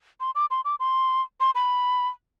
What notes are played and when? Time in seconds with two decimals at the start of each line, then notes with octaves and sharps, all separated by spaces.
0.20 C6
0.35 D6
0.51 C6
0.65 D6
0.80 C6
1.40 C6
1.55 B5